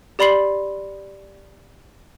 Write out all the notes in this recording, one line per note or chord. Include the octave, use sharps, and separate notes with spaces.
G4 D5 B5 C6 C7 F#7